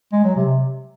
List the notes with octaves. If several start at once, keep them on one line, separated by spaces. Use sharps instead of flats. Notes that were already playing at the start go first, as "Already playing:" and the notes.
G#3
F#3
C3